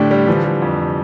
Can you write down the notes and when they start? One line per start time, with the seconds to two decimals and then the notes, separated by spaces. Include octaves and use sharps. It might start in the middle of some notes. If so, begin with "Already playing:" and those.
Already playing: A2 D3 D4 G4
0.11 G3
0.27 D3 E3 F3
0.44 G3
0.62 F2
0.79 C3